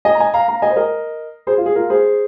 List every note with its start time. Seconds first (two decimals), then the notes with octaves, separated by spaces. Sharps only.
0.05 D#5 G#5
0.15 A#5
0.20 D#5 G#5
0.34 F5 A#5
0.48 F5 A#5
0.62 D#5 G#5
0.70 C5
0.76 A#4 D#5
1.47 G#4 C5
1.58 F4
1.66 G#4
1.75 F4 A#4
1.90 G#4 C5